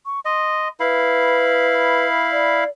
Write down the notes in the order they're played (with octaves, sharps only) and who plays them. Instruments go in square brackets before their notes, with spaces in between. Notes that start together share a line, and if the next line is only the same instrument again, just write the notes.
[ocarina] C#6
[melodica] D#5 [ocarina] C6
[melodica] E4 F5 B5 [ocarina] B4
[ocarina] D5